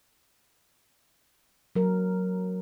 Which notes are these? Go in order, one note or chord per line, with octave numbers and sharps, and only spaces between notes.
F#3 A#4